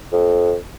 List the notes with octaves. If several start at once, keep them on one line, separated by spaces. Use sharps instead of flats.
F2